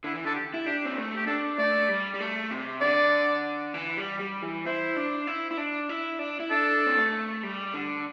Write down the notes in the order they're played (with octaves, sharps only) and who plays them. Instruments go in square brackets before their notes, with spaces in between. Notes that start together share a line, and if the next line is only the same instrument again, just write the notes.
[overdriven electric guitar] D3 [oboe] E4
[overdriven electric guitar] E3
[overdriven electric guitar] D3 [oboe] A4
[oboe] G4
[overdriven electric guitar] E4
[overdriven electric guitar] D4 [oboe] G4
[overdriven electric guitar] C4
A3
[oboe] G4
[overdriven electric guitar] D4 [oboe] A4
[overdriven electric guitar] A3 [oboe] D5
[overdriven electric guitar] G3
G3
A3
C3
[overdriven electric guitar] D3 [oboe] D5
[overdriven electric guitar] E3
G3
G3
E3
[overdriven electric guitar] E4 [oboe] C5
[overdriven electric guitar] D4
E4
E4
D4
E4
D4
E4
[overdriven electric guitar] D4 [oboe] A4
[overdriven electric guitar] C4
A3
G3
D3